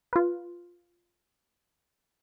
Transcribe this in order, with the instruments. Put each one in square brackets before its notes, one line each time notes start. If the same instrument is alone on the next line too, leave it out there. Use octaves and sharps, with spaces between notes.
[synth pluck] F4 B4